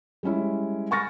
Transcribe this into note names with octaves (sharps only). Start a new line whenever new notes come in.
G3 G#3 C#4 E4
G#5 B5 C#6 F6 A6 A#6